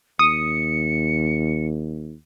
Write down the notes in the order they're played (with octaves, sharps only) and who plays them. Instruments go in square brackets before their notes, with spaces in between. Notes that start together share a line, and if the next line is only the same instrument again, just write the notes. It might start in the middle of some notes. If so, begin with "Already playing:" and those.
[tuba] D#2 [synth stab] D#6 [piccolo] C#7